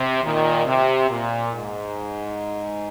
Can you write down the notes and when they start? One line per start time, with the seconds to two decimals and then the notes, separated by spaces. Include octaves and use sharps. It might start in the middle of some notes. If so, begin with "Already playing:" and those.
Already playing: C3
0.22 A#2 D#3
0.66 C3
1.09 A#2
1.53 G#2